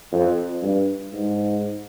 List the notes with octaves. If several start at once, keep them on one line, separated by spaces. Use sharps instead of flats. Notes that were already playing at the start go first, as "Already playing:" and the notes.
F2
G2
G#2